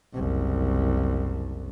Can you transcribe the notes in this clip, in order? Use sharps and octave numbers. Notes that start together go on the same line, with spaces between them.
F#1 C2